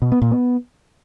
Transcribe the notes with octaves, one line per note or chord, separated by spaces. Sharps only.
B2
B3
A#2
B3